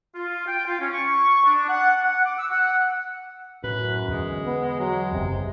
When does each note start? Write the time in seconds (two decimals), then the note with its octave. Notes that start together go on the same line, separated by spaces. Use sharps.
0.15 F4
0.47 G5
0.66 F4
0.80 C#4
0.93 C#6
1.45 D4
1.68 F#5
2.05 F#5
2.25 D6
2.38 E6
2.50 F#5
3.64 F#2 A2 B4
4.08 E2 D3 G#3
4.46 B3
4.79 F#3 G#3
5.13 F#1 E2 C3